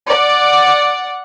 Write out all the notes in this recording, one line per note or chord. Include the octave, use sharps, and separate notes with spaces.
D5 F#5